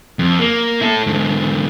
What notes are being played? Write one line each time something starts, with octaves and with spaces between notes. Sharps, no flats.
F2
A#3
E4 A4
G#2 D3